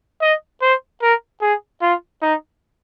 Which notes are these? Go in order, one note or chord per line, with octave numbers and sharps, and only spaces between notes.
D#5
C5
A#4
G#4
F4
D#4